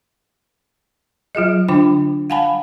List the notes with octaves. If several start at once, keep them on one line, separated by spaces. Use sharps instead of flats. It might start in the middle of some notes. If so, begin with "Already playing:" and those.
F#3 F4 G#4 D#5
D3 D4 F4 G5 D6
F5 F#5 G#5 A5 B5